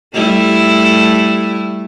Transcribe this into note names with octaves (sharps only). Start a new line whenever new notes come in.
G3 A3 E4